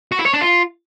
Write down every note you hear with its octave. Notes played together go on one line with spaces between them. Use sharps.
F#4
E4
C#5
D4
F4